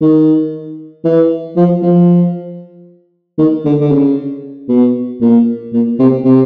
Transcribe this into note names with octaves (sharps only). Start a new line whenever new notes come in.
D#3
E3
F3
F3
D#3
D3
D3
C#3
B2
A#2
A#2
C3
C3